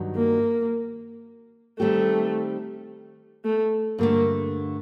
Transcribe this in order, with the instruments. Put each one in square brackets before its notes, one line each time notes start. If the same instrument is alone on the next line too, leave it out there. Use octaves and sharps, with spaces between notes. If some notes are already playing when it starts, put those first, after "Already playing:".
Already playing: [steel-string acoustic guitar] G2 D#3 F#3
[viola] A#3
[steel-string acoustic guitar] D#3 G3 C4 G4 [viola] A3
[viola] A3
[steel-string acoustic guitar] G2 D3 A3 [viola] A#3